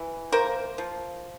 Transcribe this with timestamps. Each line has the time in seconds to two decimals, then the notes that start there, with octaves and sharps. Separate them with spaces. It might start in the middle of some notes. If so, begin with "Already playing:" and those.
Already playing: E3
0.32 A#3 A#4 C5
0.78 F3